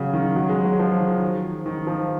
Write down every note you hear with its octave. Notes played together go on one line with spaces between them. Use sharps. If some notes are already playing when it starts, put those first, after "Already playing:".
Already playing: C#3 F#3
D#3
F#3
G#3
F#3
F3
D#3
D#3
F3